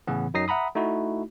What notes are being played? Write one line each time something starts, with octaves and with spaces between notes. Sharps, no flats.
A2 C#3 E3 B3
F#2 F#3 D#4 D#6 A#6 C7
E5 F#5 A#5 B5 D#6
A3 D#4 E4 F#4